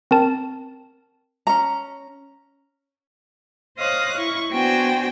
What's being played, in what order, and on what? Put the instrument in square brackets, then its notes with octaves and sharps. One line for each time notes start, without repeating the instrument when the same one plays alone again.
[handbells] C4 A#4 A5
[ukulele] C#4 A#5
[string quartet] C5 C#5 D#5 F5 D#6 F#6
E4 C#6
B3 D4 F#4 C5 G5 G#5